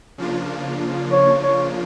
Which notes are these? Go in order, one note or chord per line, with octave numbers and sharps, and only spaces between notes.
C#3 F3 A#3 D4 F4
C#5
C#5